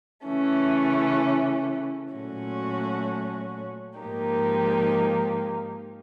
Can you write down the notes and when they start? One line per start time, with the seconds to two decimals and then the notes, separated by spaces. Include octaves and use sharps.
0.25 C#3 E3 A3 C#4
2.11 A#2 F#3 A3 C#4 F#4
3.98 G#2 F3 A#3 D#4 G4